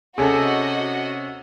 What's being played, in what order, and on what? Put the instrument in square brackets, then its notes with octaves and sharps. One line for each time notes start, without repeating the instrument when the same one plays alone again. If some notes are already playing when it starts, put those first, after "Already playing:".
[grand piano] C3 C#4 [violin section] F#4 D#5 [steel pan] G#4 A4